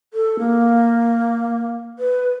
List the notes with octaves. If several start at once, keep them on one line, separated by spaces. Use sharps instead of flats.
A4
A#3
B4